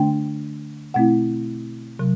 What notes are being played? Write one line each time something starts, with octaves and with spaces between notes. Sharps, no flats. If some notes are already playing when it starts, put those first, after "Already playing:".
Already playing: D3 A3 D4 G5
B2 A3 C4 E4 F#5
C3 F#3